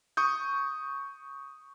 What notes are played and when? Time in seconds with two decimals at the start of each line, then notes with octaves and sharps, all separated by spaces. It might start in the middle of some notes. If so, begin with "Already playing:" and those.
0.17 C#6 D#6 G6